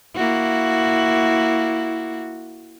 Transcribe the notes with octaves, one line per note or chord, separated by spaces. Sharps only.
A#3 E4 F#4